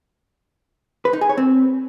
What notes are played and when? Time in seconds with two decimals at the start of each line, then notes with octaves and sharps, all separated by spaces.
1.05 B4
1.13 D#4
1.21 G#4
1.29 C#5
1.37 C4